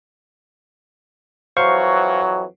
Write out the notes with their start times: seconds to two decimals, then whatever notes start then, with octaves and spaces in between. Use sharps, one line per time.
1.57 F2 E3 F#3 C5 F5 C#6